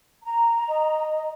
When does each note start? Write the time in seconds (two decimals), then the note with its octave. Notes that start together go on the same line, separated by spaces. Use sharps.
0.24 A#5
0.69 D#5